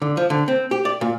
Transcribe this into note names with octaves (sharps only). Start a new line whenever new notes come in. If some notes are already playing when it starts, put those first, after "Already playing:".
D3
F3
D3
C4
G4
D5
A#2